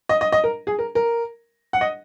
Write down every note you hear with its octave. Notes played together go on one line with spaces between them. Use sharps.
D#5
D#5
D#5
A#4
G#4
A#4
A#4
F#5
D#5